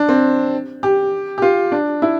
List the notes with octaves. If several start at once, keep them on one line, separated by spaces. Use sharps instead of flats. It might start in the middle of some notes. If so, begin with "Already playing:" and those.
Already playing: D4
C4
G4
G4
F4
D4
E4